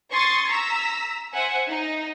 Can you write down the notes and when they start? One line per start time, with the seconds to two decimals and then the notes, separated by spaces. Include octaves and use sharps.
0.12 C6 C#6 D#6 G#6 A6
0.50 A#5 E6 B6
1.34 C5 E5 F#5 G#5
1.69 D#4